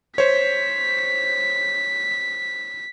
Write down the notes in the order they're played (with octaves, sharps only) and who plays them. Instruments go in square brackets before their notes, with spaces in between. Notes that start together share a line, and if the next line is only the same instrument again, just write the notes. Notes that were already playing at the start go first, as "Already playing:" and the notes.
[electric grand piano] C5 C#5 [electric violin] B6